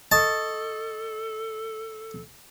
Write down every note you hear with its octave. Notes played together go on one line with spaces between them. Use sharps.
A4 D#5 A5 C#6 D#6